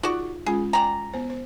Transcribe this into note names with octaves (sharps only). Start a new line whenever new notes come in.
D#4 F4 F#4 G#4 D5
G#3 C#4 F4 G#4
D5 G5 G#5 A#5
B3 C5
C5